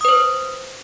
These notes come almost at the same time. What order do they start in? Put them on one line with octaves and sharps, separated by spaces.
D#6 B4 C5